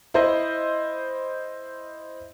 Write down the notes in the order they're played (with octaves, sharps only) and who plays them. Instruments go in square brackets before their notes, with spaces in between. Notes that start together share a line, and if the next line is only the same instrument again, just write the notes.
[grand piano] E4 C5 D#5